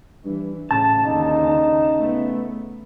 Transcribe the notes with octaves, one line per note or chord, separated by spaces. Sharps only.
G2 E3
A2 C#3 A5
D#2 D3 D#4
A3 B3